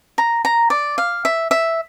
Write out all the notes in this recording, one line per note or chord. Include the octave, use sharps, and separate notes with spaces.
A#5
A#5
D5
F5
E5
E5